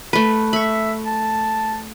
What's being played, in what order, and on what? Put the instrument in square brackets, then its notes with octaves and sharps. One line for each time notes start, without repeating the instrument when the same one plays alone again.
[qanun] A3 B4
[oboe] E5 [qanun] B5 C#6
[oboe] A5